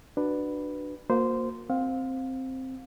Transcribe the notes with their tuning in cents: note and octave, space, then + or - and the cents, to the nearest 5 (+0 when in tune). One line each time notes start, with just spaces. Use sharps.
D4 +15 F#4 +0 B4 +0
A#3 +0 F#4 -45 C5 -15
C4 +0 F5 +25